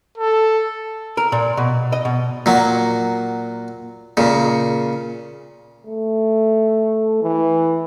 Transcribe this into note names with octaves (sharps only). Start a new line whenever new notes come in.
A4
A#4
A#2
B2
D#5
B2
A#2 F#3
A#2 C#3
A3
E3